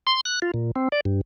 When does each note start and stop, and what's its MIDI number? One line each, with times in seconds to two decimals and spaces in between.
0.07 0.21 84
0.25 0.40 90
0.42 0.51 65
0.54 0.71 46
0.76 0.88 60
0.92 1.00 74
1.05 1.21 43